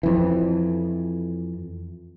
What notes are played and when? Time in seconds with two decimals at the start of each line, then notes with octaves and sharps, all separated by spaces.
0.03 F2 E3